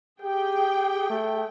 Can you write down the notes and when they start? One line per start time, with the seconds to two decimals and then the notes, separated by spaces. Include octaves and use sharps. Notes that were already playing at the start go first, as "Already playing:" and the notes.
0.22 G4 G#4 G5
1.10 A3